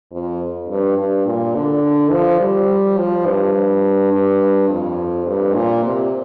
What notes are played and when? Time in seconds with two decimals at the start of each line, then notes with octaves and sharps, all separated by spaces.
0.11 F2
0.69 G2
0.97 G2
1.26 A#2
1.55 D3
2.12 F3
2.40 G3
2.98 F3
3.26 G2
4.12 G2
4.69 F2
5.26 G2
5.55 A#2
5.84 C3